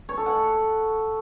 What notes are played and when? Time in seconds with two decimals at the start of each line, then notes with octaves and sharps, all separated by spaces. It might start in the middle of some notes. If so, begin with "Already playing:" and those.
0.09 C#5
0.17 A4
0.26 F#5